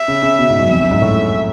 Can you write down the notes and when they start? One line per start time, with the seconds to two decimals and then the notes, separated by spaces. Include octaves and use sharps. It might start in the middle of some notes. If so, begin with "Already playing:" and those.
Already playing: E5
0.08 C#3
0.23 C#3
0.39 B2
0.50 G#2
0.60 F#2
0.70 F2 E5
0.81 F#2
0.91 G#2
1.02 A2